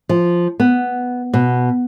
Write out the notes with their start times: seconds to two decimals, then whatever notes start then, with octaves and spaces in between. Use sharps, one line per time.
0.09 F3
0.60 B3
1.33 B2